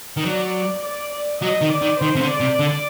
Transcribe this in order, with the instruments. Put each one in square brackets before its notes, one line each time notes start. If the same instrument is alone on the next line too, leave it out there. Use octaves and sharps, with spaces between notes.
[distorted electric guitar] D#3
[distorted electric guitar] F#3 [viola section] D5
[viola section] D5
D5
[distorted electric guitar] F#3 [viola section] D#5
[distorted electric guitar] D#3
[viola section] D5
[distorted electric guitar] D#3
[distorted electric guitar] D#3 [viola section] C5
[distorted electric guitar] C3
D3
[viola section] D5
[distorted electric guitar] C3
D3